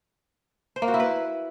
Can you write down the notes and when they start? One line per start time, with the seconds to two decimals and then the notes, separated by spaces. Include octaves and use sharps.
0.76 C5
0.82 A#3
0.88 F#4
0.94 E4
1.00 B4